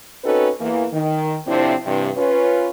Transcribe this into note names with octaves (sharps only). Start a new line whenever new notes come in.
C4 C#4 D#4 F#4 A4 B4
E2 E3 A#3
D#3
A2 C3 F3 C4 D4 E4
G2 C3 E3
C#4 F4 B4